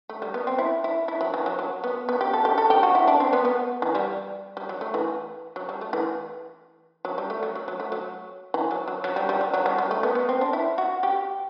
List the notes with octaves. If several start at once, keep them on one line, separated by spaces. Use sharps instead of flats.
A3
G3
B3
C4
E4
E4
E4
F#3
E3
F#3
F#3
B3
B3
G4
A4
G4
A4
G4
F#4
E4
D4
C4
B3
B3
E3
G3
G3
F#3
A3
E3
F#3
G3
A3
E3
F#3
G3
A3
F#3
F#3
F#3
A3
F#3
E3
F#3
F#3
F#3
G3
G3
F#3
F#3
G3
G3
A3
B3
B3
C4
D4
E4
F#4
G4